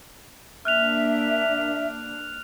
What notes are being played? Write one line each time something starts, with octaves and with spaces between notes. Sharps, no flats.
A#3 D4 E5 F6 F#6 F7